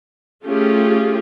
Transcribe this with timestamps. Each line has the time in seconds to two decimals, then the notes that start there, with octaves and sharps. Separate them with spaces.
0.45 A3 C#4 F4 G4 G#4